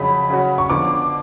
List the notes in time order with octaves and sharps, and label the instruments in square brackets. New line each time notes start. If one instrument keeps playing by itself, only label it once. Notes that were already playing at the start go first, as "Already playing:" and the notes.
Already playing: [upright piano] F2 C#3 F#3 [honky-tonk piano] B5
[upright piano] C#3 F#3 C#4 F#4
[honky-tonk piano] C#6
[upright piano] F2 D3 F3 B3 [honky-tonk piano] D6